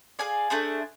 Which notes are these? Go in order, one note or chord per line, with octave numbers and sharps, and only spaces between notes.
G#4 D5 F5 G#5
A3 D4 G#4 C5